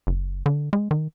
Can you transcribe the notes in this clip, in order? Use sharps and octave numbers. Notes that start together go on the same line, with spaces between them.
F#1
D3
G#3
D#3